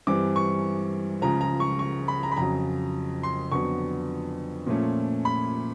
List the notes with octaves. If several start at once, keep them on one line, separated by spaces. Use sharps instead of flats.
G2 E3 G3 C4 D6
C#6
C#2 C#3 F3 A#5
A#5
C#6
C#6
B5
A#5
B5
F2 C#3 F#3 A#5
C6
F2 D3 F#3 B3 C#6
A#2 F3 A3 C#4
B5